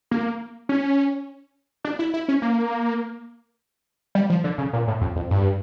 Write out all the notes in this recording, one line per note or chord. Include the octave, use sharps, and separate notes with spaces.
A#3
C#4
D4
E4
E4
C#4
A#3
G3
F3
D3
C#3
A#2
A2
F2
F2
G2